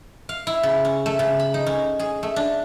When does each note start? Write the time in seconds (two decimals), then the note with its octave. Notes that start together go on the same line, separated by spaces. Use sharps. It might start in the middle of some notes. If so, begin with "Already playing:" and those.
0.29 F5
0.47 E4
0.63 C#3
0.85 C#4
1.06 A3
1.19 C#3
1.39 B5
1.54 D#4
1.66 C#4
1.99 G#4
2.23 A3
2.36 D4